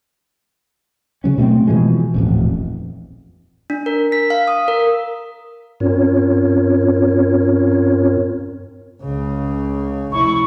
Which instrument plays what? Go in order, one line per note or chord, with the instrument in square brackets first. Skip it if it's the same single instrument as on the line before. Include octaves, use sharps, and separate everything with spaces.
[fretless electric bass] C#3 F#3 C#4
B2 A3 A#3 C4
B2 E3 F3 G#3
D#1 A1 F2
[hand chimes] D4
A#4
B6
F5
D#6
A#4
[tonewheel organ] G2 C4 C#4 F4 A#4 C#5
[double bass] C#2 C#3
[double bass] F1 E4 [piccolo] C#6